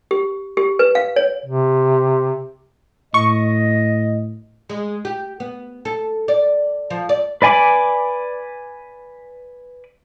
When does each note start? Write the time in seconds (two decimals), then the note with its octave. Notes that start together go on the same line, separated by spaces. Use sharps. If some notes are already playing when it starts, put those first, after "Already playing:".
0.11 G4
0.57 G4
0.79 B4
0.95 F5
1.16 C#5
1.45 C3
3.14 A2 D#5 C#6
4.70 G#3
5.05 G4
5.40 B3
5.85 A4
6.28 D5
6.90 F3
7.09 D5
7.42 B4 D5 G#5 B5 D6